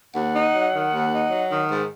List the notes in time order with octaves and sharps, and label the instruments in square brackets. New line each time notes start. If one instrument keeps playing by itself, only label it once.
[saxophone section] D#2 [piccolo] F#5
[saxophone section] D#4
F#3
D#3
D#2
D#4
F#3
D#3
G#2